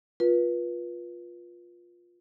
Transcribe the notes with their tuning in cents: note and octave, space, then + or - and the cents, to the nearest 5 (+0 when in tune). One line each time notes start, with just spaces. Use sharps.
F4 +10 B4 -30